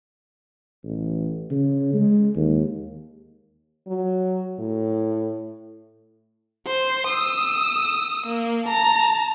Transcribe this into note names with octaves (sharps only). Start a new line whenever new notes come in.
A1
C#3
G#3
D#2
F#3
A2
C5
D#6 E6
A#3
A5 A#5